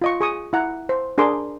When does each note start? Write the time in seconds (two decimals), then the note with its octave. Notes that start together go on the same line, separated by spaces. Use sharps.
0.01 F4 D#5 C#6
0.21 G#4 C#6 D#6
0.53 E4 F#5 A#5
0.89 C5
1.18 D4 G#4 A#4 C6 D6